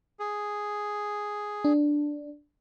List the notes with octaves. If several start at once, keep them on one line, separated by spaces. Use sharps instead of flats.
G#4
D4